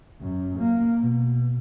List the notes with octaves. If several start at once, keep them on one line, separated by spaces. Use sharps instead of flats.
F#2
A#3
B2